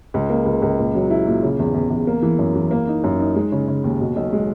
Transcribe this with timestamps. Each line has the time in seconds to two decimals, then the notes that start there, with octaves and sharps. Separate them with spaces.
0.14 C#2
0.30 A#3
0.46 C#2
0.62 C#2
0.79 A#2
0.95 F#3
1.10 E4
1.27 A#2
1.43 C#3
1.59 E2
1.74 E2
1.90 E2
2.07 A#3
2.22 E3
2.39 F#2
2.55 E3
2.71 A#3
2.87 D#4
3.04 F#2
3.19 D#4
3.36 G#3
3.52 C#3
3.68 C#3
3.84 D#2
4.00 B2
4.16 B1
4.33 G#3